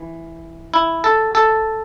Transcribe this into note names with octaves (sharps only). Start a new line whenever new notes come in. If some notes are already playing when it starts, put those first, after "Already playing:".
Already playing: E3
E4
A4
A4